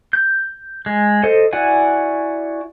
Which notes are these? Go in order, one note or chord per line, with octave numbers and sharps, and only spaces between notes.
G6
G#3
A4 C5 D#5
E4 F#4 D5 F#5 G#5